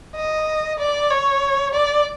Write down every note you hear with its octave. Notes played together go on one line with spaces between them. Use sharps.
D#5
D5
C#5
D5